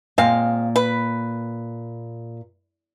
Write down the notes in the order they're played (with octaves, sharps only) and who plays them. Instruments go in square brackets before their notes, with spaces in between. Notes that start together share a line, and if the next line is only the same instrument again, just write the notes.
[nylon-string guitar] A#2 [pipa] G#3 C4 F5
[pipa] B4